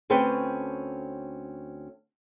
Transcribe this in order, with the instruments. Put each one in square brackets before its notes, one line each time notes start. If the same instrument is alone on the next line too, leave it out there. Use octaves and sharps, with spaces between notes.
[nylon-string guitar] D2 C4 C#4 A4 B4 G5